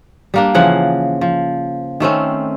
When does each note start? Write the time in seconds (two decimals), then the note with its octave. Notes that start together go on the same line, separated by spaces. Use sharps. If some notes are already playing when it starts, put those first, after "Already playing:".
0.34 G3 A#3 D4
0.54 C#3 E3 F3 F#5
1.21 F3
2.00 D#3 A3 C4 C#4